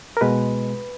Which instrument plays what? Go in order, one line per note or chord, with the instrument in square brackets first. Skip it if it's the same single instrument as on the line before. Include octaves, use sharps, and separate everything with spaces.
[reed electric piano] A#4
B2 G#3 B4